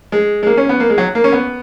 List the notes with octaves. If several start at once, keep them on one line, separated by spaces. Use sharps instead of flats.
G#3
G#3
A#3
C#4
B3
A#3
G#3
F#3
A#3
C#4
B3